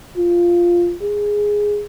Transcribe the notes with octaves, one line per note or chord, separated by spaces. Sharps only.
F4
G#4